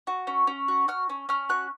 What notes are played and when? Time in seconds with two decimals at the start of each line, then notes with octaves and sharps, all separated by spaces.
0.07 F#4
0.27 C#4
0.47 C#4
0.68 F#4
0.88 F#4 F6
1.09 C#4
1.29 C#4 F6
1.49 F#4 F#6